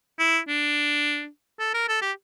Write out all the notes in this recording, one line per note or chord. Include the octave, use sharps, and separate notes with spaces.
E4
D4
A4
A#4
A4
G4